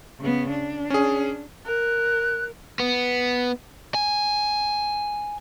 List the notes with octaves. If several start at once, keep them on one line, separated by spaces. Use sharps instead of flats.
C#3 B3
D4
C#4 G#4
A#4 F#6
B3
G#5